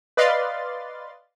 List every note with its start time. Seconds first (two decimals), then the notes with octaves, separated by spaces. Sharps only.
0.17 B4 D5 D#5 F5 C6 A6